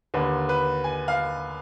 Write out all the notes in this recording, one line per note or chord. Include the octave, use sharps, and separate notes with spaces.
D#2 D3 B4
B4
G#5
F5